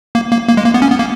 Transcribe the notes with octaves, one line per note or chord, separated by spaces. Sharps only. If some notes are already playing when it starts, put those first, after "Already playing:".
A#3
A#3
A#3
G#3
A#3
B3
C#4
B3
A#3